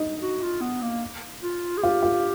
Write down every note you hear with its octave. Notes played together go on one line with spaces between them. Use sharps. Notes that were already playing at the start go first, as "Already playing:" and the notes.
Already playing: D#4
F#4
F4
B3
A#3
F4
G#4
F4 G4
F4